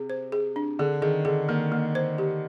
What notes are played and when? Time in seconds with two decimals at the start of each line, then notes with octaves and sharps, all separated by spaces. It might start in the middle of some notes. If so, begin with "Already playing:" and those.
Already playing: C3 G#4
0.10 C5
0.32 G#4
0.56 D4
0.79 D3 G#4
1.02 D#3 G#4
1.25 D3 G#4
1.49 D#3 A#3
1.72 A#3
1.95 C5
2.18 G4